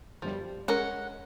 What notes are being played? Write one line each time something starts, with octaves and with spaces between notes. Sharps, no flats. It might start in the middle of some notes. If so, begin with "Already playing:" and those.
G1 F#2 F3 G3
G#3 C#4 A#4 F#5